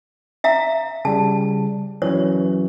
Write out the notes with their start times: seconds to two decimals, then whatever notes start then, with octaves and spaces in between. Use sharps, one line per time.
0.44 E5 F5 A#5
1.05 C#3 G3 A5
2.02 E3 F#3 C#4 C#5